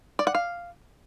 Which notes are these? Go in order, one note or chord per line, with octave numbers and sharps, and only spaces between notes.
D5
F#5
F5